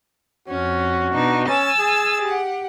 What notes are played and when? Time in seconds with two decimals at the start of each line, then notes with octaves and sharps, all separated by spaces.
0.48 F2 C#4 F#4
1.12 B2 D4 D#4
1.49 C#4 G#5 E6 A6
1.79 G#4
2.22 G4 F#5